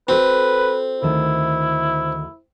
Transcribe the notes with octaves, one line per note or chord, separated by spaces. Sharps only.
C4 F#4 A4 B4 D5
D2 D#3 E4 A5